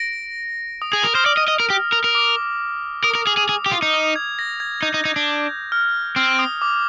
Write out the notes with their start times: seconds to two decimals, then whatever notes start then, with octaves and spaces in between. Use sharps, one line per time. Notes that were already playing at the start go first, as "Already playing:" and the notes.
Already playing: A#6 D7
0.82 D#6
0.92 G#4 D#6
1.04 A#4 D#6
1.15 C5 F6
1.25 D5 D#6
1.37 D#5
1.48 D#5
1.60 A#4
1.70 G4
1.93 A#4
2.04 A#4
2.15 D6
3.04 A#4 D#6
3.15 A#4
3.27 G#4
3.37 G#4
3.49 G#4
3.66 G4
3.71 F4
3.82 D#4
3.94 D#6
4.16 G#6
4.39 A#6
4.60 G#6
4.82 D#4 G6
4.94 D#4
5.05 D#4
5.16 D4
5.72 F6
6.16 C4 F6
6.39 D#6
6.62 D6